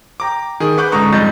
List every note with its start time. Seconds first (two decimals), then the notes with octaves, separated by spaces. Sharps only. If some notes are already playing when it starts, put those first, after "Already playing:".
0.20 G5 A#5 D6
0.60 D#3 G#4
0.77 B4 F#5 C#6 D6 F#6 G6
0.92 C#2 G#2 D3 A#5 C#6 D#6
1.13 F2 G#2 G3 D#5 G6 A6